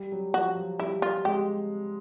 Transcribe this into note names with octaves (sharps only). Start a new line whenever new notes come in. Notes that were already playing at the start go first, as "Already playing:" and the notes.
Already playing: G3
F#3
F3 F#4
F#3
G3 E4
F4
G#3 G4